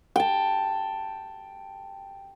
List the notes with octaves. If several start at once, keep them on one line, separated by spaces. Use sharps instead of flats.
G5 A5